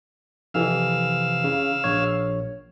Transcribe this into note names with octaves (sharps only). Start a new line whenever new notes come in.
F2 C3 E3 F5 E6
C#3
A#1 C#5